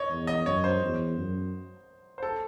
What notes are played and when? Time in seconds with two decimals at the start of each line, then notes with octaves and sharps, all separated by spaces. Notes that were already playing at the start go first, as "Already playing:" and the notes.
Already playing: C#5 D#5
0.10 E2
0.27 D#5
0.46 F#2 C#5
0.64 C5
0.81 E2
1.17 F#2
2.18 C5
2.23 A4